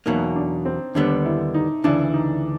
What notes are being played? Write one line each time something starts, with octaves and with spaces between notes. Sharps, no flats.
E2 B2 F#3 A#3 D#4
D4
C4
D#2 D3 G3 B3 D4
E4
D#4
D2 C#3 E3 D4
D#4